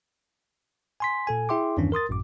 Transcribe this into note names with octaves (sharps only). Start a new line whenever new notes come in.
G#5 C6 B6
A#2 A4 G#5
E4 G#4 E5 G5 C6 D6
E2 G2 D#3 E3 C#4 D4
A#4 C6 D#6 A6
G#1 F#2 A2 D6